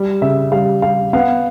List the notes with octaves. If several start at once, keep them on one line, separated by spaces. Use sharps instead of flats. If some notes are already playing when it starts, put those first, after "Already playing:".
Already playing: G3
C#3 E5
G3 F5
G3 F5
B3 F5